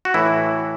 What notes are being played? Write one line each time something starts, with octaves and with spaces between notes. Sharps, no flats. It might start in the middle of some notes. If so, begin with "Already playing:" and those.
F#4
A2 E3 E4